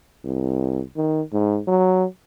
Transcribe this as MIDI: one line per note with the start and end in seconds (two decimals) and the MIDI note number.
0.25 0.81 36
0.97 1.22 51
1.33 1.59 44
1.67 2.05 54